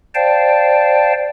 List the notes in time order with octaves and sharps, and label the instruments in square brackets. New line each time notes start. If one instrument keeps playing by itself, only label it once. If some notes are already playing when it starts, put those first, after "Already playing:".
[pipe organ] C5 D5 F5 G5 A5